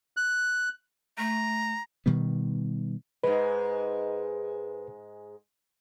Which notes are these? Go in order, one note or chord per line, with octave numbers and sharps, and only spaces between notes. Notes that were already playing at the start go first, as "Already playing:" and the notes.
F#6
A3 A#5
B2 D#3 G3 B3
G#2 G#3 B4